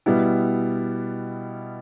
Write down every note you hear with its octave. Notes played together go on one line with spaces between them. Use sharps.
B2 G3 B3 E4